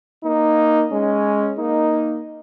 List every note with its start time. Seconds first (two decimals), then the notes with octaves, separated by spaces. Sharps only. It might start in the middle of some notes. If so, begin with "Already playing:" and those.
0.24 A#3 D#4
0.90 G#3 C#4
1.57 A#3 D#4